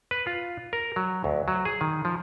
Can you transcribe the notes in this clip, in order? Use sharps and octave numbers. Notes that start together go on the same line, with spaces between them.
B4
F4
A#4
F#3
D2
F#3
G#4
D#3
F3